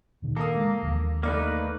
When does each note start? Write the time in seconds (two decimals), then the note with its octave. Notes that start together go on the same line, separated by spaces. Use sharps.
0.22 A#2 D3 D#3
0.36 A#3 A4 A#4 D#6
0.56 G#3
0.82 D#2 D3 F3
1.23 A3 A#3 D#4 B4 D5